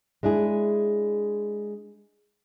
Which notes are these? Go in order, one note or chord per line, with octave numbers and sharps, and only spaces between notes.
G#3 D4 E4 G#4